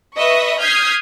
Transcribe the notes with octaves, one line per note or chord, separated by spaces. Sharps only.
B4 D#5 E5 C#6 D#6
D#6 F6 G6 G#6 B6 C7